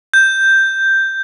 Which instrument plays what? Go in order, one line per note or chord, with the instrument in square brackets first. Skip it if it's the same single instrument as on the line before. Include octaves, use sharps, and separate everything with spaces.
[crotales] G6